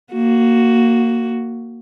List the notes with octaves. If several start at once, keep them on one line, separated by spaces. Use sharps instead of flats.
A#3 F#4